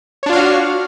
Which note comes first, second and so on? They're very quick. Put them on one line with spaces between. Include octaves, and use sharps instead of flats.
C#5 D4 F4 F5 F#4